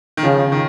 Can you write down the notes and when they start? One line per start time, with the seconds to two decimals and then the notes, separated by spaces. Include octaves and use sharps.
0.17 D#3
0.23 C#3 F3
0.52 D#3